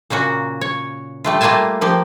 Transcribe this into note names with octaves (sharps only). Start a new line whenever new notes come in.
A#2 C#3 A#3 F#4
C#5
G3 A3 F4
G3 A3 A#3 F4 G#5 A5
F3 A#3 G4